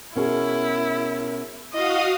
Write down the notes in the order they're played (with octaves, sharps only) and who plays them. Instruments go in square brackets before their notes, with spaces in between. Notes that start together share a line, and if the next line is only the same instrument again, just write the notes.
[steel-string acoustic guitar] B2 C#4 G#4 [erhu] E4 [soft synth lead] A#4
[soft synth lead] E4 [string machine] F#4 F5 D#6 [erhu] D#5